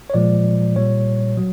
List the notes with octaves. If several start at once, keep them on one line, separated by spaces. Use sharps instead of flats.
C#5
A#2 F3 G#3 D5
A#2 G3 C#5
F#3